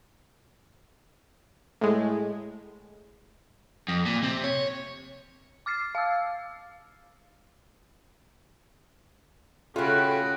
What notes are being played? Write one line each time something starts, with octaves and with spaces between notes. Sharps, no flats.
A2 G#3
F2
A#2
C3
C#5
D6 F6 A6 C7
F5 E6
C#3 A3 C#4 F4 F#4 G5 B5 F#6